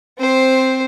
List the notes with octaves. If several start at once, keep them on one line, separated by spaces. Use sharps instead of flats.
C4 C5